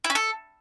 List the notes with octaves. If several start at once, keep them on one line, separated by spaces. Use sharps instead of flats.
E4
C#4
A4